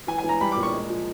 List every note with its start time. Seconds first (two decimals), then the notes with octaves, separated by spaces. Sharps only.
0.07 E3 G#5
0.18 G#5
0.23 E3
0.29 A#5
0.41 G3 B5
0.52 D6
0.56 A#2
0.63 C#6
0.73 G#3
0.89 F3